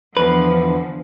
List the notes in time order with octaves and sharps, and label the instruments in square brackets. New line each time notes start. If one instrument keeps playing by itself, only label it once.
[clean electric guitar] E2 B4 [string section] D3 F3